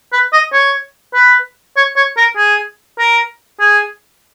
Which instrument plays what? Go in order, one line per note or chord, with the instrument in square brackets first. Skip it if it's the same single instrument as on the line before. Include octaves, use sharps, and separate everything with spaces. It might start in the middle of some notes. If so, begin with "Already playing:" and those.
[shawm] B4
D#5
C#5
B4
C#5
C#5
A#4
G#4
A#4
G#4